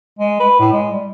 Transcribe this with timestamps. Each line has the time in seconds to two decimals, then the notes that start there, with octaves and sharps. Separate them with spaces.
0.19 G#3
0.40 B4
0.60 A2
0.73 G#3
0.92 G3